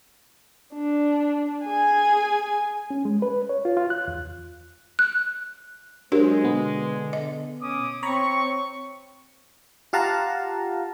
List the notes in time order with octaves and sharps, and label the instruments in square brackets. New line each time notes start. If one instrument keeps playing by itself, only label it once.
[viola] D4
G#4 G#5
[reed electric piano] C#4
G#3
B4
C#5
F4
F4
F#6
E2
[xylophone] F#6
[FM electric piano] F#3 [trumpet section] G#3 [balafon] D4 G4 A#4 [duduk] C5
[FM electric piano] B2 B3 [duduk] D3
[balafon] D#5
[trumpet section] C#4 D6 D#6
[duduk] C4 [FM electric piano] C#5 A#5 B5 [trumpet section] C#6
[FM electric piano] F4 G4 F5 F#5 A5 A#5